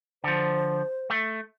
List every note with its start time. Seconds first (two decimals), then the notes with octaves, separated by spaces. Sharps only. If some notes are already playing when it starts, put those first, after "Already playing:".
0.24 D3 F3 C5
1.10 A3